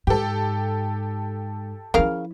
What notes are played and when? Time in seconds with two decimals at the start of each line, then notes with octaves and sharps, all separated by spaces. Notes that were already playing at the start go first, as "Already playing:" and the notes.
0.07 G#2 G4 A4
1.94 C#3 F3 E4 A#4 F5